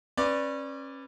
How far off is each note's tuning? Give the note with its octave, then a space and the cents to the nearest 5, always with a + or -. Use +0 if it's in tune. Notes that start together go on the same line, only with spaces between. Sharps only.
C#4 -30 B4 +0 D5 +0